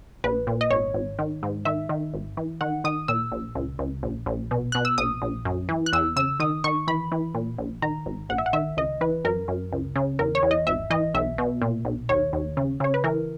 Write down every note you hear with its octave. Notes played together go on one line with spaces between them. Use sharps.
A#1 B4
A#2
D#5
G#1 C#5
G#1
D#3
G#2
D#3 E5
D#3
G#1
E3
D#3 F#5
D#3 D#6
A#2 E6
A#1
C#2
C#2
A#1
A#1
B2
B2 F#6
E6
A#1 D#6
A#1
F#2
E3
F#6
E2 E6
C#3 E6
D#3 D#6
D#3 C#6
E3 B5
E3
A#2
A#1
D#3 A#5
G#1
A#1 F#5
E5
F#5
D#3 E5
C#2 D#5
E3 B4
F#2 A#4
F#2
C#2
C#3
E2 A#4
C#5
E2
D#5
G#1 E5
E3 D#5
B1 E5
B2
A#2
B1
D#2 C#5
D#2
C#3
C#3 C#5
B4
E3 A#4